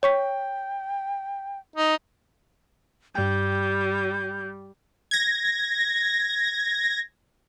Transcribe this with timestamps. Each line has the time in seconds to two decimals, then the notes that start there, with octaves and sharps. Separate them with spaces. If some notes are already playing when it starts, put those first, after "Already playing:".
0.03 C#5 G5 C#6 B6
1.76 D#4 D#6
3.15 G2 G3 G5 G6
5.11 G#6 A#6